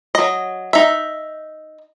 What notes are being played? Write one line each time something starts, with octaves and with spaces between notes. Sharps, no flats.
F#3 D#5
D#4 E5